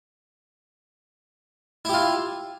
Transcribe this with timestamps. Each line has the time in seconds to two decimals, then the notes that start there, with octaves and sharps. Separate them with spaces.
1.85 E4
1.89 G4
1.93 F4